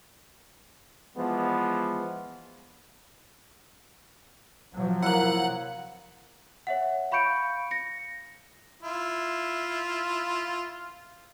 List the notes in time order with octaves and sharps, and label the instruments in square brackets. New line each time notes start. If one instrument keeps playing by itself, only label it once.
[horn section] E3 F3 G#3 B3
[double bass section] C3 F3 F#3
[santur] A#3 E4 [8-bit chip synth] F#5 F#6
[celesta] C#5 E5 F#5
F5 B5 C#6 G6 C#7 D7
A#6 C#7
[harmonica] E4 F4